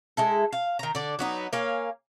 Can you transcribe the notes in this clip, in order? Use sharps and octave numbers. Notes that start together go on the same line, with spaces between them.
G#3 E4 A4
F5
D#3 A#5
D3 D5
F#3 B3 D#4
A#3 C#5 F5 G#5